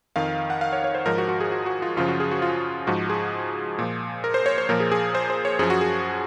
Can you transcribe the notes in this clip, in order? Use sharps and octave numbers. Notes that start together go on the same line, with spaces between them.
F2 D#3 F5
F#5
F5
C#5
C#5
C5
G#2 F3 A#4
F#4
F#4
G#4
F#4
F#4
F4
F#2 C#3 F3 F4
F#4
G#4
F#4
F4
G#2 F3 F#4
G#4
A#2 F3
A#4
C5
C#5
C5
A#2 F3 A#4
G#4
G#4
C5
C5
C#5
F#2 F3 G#4
F#4
G#4